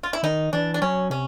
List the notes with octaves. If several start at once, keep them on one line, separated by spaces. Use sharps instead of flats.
F4
E4
D#3 D#4
E3 D4
D4
F#3 C#4
C3 C#4